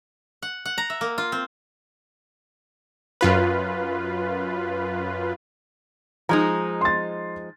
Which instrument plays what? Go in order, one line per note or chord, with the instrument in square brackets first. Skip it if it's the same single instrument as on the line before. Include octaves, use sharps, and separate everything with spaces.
[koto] F#5
F#5
A#5
E5
A#3
F4
C4
[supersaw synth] F#2 F4 B4
[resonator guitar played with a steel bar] F3 G#3 D#4 [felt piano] A#5
[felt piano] C6 A6